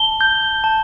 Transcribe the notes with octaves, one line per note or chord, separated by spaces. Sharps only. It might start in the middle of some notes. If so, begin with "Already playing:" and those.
Already playing: A5 G7
G6
A5